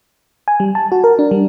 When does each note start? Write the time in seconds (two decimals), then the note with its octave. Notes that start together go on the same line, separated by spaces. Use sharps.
0.48 G#5
0.60 G3
0.75 A5
0.92 F#4
1.04 A#4
1.19 D4
1.31 G3